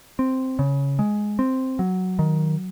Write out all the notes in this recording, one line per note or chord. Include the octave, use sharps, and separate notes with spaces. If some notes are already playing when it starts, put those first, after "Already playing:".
C4
C#3
G#3
C4
F#3
D#3